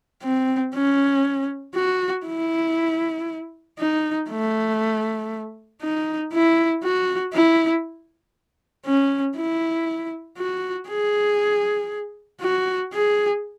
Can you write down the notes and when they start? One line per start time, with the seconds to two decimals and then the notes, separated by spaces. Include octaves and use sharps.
0.23 C4
0.74 C#4
1.75 F#4
2.26 E4
3.79 D#4
4.30 A3
5.81 D#4
6.32 E4
6.83 F#4
7.33 E4
8.86 C#4
9.37 E4
10.38 F#4
10.89 G#4
12.41 F#4
12.93 G#4